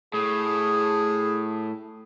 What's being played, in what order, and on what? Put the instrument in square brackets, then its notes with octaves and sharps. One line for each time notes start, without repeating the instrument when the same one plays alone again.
[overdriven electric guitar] A2 [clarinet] G#4